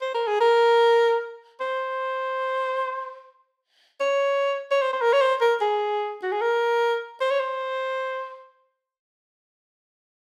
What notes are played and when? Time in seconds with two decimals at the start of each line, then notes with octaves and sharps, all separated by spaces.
0.01 C5
0.14 A#4
0.27 G#4
0.40 A#4
1.60 C5
4.00 C#5
4.71 C#5
4.81 C5
4.93 C5
5.01 A#4
5.13 C#5
5.21 C5
5.41 A#4
5.61 G#4
6.23 F#4
6.32 G#4
6.42 A#4
7.21 C5
7.31 C#5
7.40 C5